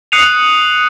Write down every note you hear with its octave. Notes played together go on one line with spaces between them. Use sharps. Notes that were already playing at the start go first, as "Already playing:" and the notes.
D#6 F#6 C7 C#7 D#7 F7